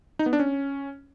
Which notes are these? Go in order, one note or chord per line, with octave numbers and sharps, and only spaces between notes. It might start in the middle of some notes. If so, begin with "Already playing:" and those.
D#4
B3
D4
C#4